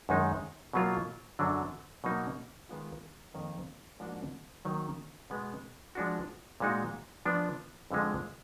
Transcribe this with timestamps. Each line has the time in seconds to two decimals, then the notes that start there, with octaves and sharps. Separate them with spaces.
0.09 F#2 D#3 G#3 D#4
0.73 B2 F#3 A#3 F4
1.39 F#2 D3 F#3 D4 F#4
2.04 B2 F#3 A#3 D#4 F#4
2.69 D#3 G#3 B3 F4
3.34 F2 D#3 A#3
4.00 G#2 F3 A#3 D4 F#4
4.65 D#3 F#3 A#3 D#4
5.30 B2 G#3 B3
5.95 F3 G#3 D4 F#4
6.60 A#2 G#3 D#4 F#4
7.25 F3 B3 D4
7.91 F2 D3 F3 G#3